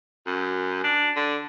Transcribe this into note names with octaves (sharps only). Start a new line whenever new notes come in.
F#2
D4
D3